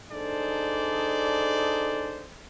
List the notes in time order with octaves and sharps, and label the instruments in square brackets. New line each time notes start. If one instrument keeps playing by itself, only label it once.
[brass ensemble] D4 D#4 G#4 A4 C5 D5